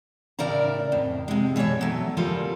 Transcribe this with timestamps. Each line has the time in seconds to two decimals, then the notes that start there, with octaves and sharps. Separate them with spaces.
0.39 A2 C#3 A#4 D5 E5 A#5
0.92 F2 A2
1.28 C3 G#3
1.56 B2 E3 A4 C#5 E5
1.81 F#3 A3
2.17 C#3 F3 G3 F4 A4 A#4